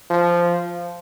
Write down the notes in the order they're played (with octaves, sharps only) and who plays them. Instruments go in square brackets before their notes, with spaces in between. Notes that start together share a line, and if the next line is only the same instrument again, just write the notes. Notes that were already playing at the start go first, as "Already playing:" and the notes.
[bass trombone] F3